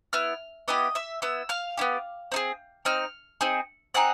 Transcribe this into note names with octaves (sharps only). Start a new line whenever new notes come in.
B3 E4 F6
B3 E4 G4 D#5 D#6
E5 E6
B3 E4 E6
F5 F6
B3 E4 G4
C4 D#4 G#4
C4 D#4 F6
C4 D#4 G#4
C4 D#4 G#4 F#5 F#6